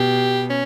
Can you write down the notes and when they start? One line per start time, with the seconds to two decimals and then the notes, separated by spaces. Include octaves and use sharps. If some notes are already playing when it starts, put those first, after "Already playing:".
Already playing: B2 G4
0.50 C#4